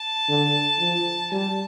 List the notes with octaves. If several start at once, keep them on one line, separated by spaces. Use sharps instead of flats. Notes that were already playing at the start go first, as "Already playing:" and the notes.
Already playing: A5
D3
F3
G3 A5